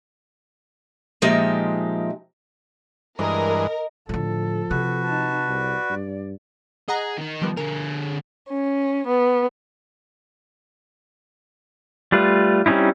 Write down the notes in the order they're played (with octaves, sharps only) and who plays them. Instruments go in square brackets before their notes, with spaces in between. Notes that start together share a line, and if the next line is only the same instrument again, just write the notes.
[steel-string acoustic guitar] A#2 F3 G#3 D#4 G4 E5
[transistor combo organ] G2 E3 G#3 [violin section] A#4 [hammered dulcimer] D#5
[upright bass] A2 D3 [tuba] F3 [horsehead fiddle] A4
[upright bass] C3 [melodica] F#4 B4
[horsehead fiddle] D#4 A5
[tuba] C2 [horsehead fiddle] D5
[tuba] G2
[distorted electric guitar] G#4 [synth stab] D#5 F#5 A#5
[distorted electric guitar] D#3 D#4
[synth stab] F3 G3 B3
[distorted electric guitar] D3 G#4 [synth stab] A#4
[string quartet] C#4
B3
[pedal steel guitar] G3 A3 F4 B4
G3 C4 C#4 D#4 E4